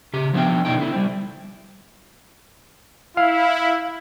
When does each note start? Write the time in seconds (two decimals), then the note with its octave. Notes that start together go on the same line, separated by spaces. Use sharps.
0.14 C#3 G4
0.33 F3 A3 B3 D4 E5 G5
0.65 B2 G3 D#4 G5
0.77 D3 E4
0.93 G3 C4
3.17 E4 F5